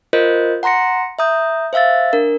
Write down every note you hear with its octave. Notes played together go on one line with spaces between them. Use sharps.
F4 A#4 C5 D#5 G6
F#5 A#5 C6 A#6 C#7
E5 A#5 D#6 G6
C5 E5 F5 E6 A6
D4 A#4